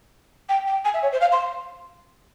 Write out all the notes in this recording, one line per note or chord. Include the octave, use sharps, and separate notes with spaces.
G5
G5
G#5
E5
C#5
C5
F5
C6